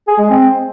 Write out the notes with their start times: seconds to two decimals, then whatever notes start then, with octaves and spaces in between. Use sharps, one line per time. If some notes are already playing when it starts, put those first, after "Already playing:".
0.08 G#4
0.19 G#3
0.30 C4